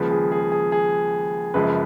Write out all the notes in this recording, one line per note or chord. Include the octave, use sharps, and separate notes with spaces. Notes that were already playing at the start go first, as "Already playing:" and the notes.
Already playing: D#2 C#3 F3 G#3 B4
G#4
G#4
G#4
G#4
F#1 F#2 F3 G#3 B4